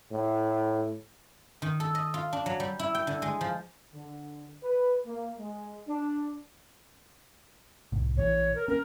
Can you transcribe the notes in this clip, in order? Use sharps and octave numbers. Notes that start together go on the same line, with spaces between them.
A2
D#3
A4
D#5
F4
D4
F#3
G3
E4
G5
D3
G#3
F3
D3
B4
A#3
G#3
D4
C2 A2
A#1 A#2 E3 C#5
A#4
A#3 C#4 A#4